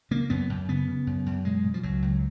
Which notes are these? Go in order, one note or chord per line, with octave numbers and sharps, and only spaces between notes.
C#3 A#3
F#2 B3
F#2
C#3 B3
C#3
F#2
F#2
B2 G#3
B2
F3
C#2 F#3
C#2